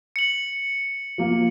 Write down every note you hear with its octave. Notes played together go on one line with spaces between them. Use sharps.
C#7 F#7
F3 A#3